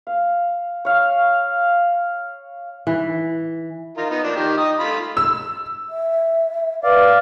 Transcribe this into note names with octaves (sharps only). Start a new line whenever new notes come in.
F5
C#5 F5
E3
D#4 F4 A#4
B3 D#4
F3 A#3 D4
D#3 G4
D#4 D#5 D#6
A3 F4 B5
E6
E5
B4 D5 F5